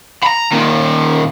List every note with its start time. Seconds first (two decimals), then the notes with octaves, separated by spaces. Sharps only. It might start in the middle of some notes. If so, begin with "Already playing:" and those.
0.24 A#5 B5
0.52 A#2 D#3